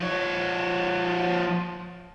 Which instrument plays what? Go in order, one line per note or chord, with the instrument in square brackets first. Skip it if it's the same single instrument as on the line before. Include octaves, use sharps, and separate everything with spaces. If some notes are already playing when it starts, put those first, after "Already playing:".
[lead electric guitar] F3 C#5